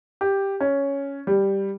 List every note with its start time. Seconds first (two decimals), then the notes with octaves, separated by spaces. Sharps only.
0.21 G4
0.60 C#4
1.27 G3